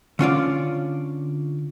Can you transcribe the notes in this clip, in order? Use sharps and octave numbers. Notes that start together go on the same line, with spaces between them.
D3 C#4 F4 D5